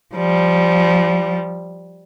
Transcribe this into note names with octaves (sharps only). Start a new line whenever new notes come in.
F3 G3